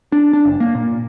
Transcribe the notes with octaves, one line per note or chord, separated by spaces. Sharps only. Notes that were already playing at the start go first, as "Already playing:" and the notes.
D4
D4
F#1
A#3
A#2